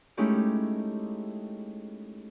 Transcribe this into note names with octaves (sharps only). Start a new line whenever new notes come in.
G#3 A3 C#4 D#4 E4 G4